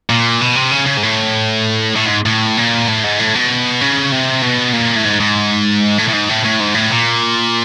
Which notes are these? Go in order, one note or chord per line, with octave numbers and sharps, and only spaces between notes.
A#2
B2
C3
C#3
C#3
G#2
A2
A2
G#2
A2
A#2
A2
G#2
A2
B2
C#3
C3
B2
A#2
A2
G#2
G#2
A2
A2
G#2
A2
A2
G#2
A2
A#2